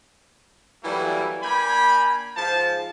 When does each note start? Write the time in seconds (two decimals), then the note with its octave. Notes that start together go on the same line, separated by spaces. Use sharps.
0.83 E3 F#3 G3 A3 A#3 E4
1.43 A#3 D4 G5 G#5 B5
2.36 G#2 F3 A5